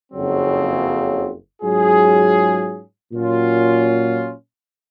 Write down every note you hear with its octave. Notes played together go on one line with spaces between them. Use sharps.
F#1 F2 C#3 F#3 C4
G#2 F#3 C#4 F4 G#4
A#2 F#3 C#4 F4